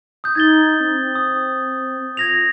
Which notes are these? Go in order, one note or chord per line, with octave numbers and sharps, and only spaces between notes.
D#6 G6
D#4 G#6 A6 G7
C4
D#6
F4 G#6 A#6 F7